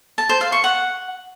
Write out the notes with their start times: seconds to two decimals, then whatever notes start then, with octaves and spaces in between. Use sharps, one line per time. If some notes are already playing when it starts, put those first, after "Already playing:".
0.18 A5
0.29 C5
0.41 F5
0.52 C#6
0.64 F#5